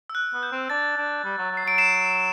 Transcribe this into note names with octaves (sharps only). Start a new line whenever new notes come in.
E6
F#6
B3
G6
C4
D4 A6
D4
G3
F#3
F#3
C7
F#3 D7
C7 E7